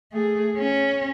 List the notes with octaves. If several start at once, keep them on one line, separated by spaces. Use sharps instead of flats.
A3 G#4
C#4